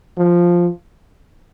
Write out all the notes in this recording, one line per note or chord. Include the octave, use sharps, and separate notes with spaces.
F3